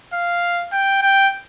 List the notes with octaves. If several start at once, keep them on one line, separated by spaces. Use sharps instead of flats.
F5
G5
G5